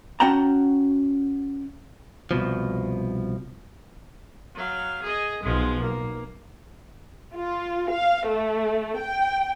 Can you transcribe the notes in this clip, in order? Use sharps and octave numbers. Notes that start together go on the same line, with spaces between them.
C#4 F#4 F#5 G5 A5 A#5
C2 F2 B2 F3
F#3 F5
G#4 D#5
B1 F3 G#3
A#3
F4
F5
A3
G5